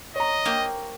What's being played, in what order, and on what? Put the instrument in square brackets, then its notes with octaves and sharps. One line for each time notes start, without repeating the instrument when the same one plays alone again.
[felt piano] C#5 A#5 [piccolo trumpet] D#5
[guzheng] A#3 G4 C5